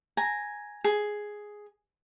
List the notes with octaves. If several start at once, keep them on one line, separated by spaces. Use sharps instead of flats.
G#5 A#5
G#4